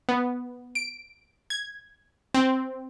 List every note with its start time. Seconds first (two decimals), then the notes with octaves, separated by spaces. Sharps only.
0.09 B3
0.75 D7
1.50 G#6
2.34 C4